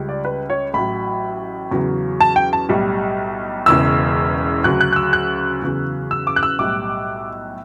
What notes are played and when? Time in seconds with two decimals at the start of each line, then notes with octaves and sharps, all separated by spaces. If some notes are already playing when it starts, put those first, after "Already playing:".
Already playing: C#2 C#3 G3
0.09 D5
0.25 B4
0.50 C#5
0.74 A1 A2 F#3 B5
1.71 E2 C#3 F#3
2.21 A5
2.36 G5
2.53 A5
2.69 B1 A2 G3
3.66 E1 E2 C#3 E3 E6
4.64 D2 C#3 F#3 F#6
4.81 F#6
4.93 F#6
4.96 E6
5.13 F#6
5.62 E2 C#3 F#3
6.11 E6
6.27 D6
6.36 F#6
6.43 E6
6.59 B1 A2 G3 D6